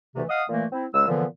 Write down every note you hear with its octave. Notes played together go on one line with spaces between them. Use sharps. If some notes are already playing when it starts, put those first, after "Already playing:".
D2 C3 E3 A3
D#5 F5 F#5 D#6
A#2 E3 A3 A#3
C4 E4
C#2 G#3 E6
A#2 D3 E3 F3 B3